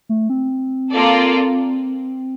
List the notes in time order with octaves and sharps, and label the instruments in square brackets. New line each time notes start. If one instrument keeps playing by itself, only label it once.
[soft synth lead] A3
C4
[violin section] A#3 F4 A4 D5